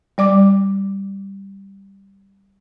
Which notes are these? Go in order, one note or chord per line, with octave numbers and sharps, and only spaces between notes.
G3 D5 D6